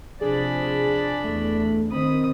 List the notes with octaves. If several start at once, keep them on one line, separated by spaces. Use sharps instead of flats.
C3 F3 D4 G#4 D5 B5
E2 A3
D#3 C4 B5 D#6